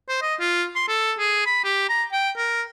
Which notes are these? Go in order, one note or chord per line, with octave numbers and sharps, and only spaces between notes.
C5
D#5
F4
C6
A4
G#4
B5
G4
A#5
G5
A#4